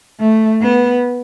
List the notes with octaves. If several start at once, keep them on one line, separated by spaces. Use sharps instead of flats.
A3
B3